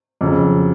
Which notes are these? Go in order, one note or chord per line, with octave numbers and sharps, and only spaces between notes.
F2 C#3 F#3